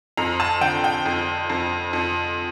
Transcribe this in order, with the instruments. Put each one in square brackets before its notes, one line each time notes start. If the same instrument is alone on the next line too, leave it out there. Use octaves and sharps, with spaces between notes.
[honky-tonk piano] F2 A#5
A5
D3 G5
G5
F2
F2
F2